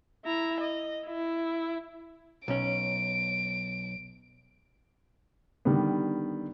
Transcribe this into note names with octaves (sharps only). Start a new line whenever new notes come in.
E4 A#5
D#5
E4
B1 C#4 D7
D3 D#3 G3 B3